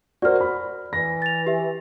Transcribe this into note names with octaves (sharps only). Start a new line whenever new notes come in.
F#4 A#4 C5 D5 F6
B5
E3 A#6
A6 F7
G4 E5